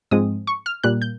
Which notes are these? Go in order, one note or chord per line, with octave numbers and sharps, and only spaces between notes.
G#2 F3 G#3 C4 D#6
C#6
F6
A#2 G3 A#3 F#6
G6